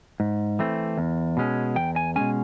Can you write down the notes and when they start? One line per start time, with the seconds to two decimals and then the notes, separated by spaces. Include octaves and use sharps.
0.20 G#2
0.59 E3 A3 C4
0.98 E2
1.37 B2 G#3 C#4
1.76 E2 G5
1.96 G#5
2.16 B2 G#3 C#4 G#5